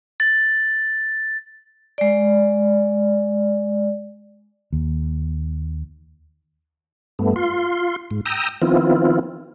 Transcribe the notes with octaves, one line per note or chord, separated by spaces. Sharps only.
A6
G#3 D5
D#2
G2 A3 B3
F4 C6
G#2
G5 A#5 D#6 E6
D#3 F3 B3 C4 E4 F4